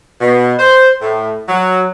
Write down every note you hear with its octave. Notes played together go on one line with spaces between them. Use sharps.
B2
C5
A2
F#3